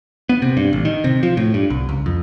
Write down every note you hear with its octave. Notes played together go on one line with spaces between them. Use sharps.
B3
C3
G2
A1
D#3
C3
F3
A2
G2
C2
C#2
F2